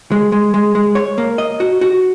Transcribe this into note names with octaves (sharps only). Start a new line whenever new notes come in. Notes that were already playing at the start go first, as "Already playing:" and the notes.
G#3
G#3
G#3
G#3
C#5
A#3
D#5
F#4
F#4